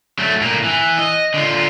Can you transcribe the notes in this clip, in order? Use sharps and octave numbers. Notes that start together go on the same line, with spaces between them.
F#3 A3
A2 A#3
E3
D#5
D3 F4